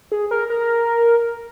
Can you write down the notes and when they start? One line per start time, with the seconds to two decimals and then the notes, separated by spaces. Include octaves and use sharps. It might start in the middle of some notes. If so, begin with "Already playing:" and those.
0.12 G#4
0.31 A#4
0.50 A#4